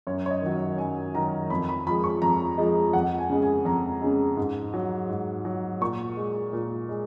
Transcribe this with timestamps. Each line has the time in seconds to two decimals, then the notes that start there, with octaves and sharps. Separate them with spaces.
0.07 F#2 C#5
0.26 C#5
0.31 D#5
0.42 D#3 F#3
0.78 F#2 G#5
1.15 D#3 F#3 A#5
1.50 F2 B5
1.69 B5
1.87 F3 G#3 B5
2.04 C#6
2.22 F2 A#5
2.58 F3 G#3 D#5
2.93 F2 F#5
3.18 G#5
3.30 C#3 G#3
3.42 G#5
3.65 F2 A#5
4.02 C#3 G#3
4.37 G#2
4.74 F#3
5.09 G#2
5.45 F#3
5.81 A#2 C#6
6.17 G#3
6.53 A#2
6.89 G#3